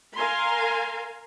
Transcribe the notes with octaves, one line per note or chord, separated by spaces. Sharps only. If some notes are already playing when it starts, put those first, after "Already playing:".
A#4 F5 G#5 A#5 C6